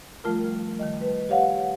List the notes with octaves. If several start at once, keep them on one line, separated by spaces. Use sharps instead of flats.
F3 G3 A3 F4 A#4
D#3 G3 D#5
B4
G4 C#5 F5 F#5